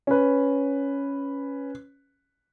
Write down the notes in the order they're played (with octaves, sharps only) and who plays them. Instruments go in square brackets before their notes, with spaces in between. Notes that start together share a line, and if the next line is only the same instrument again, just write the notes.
[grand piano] C#4 B4